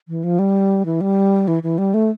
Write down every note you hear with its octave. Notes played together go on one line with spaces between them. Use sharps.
E3
F3
G3
E3
G3
E3
E3
G3
A3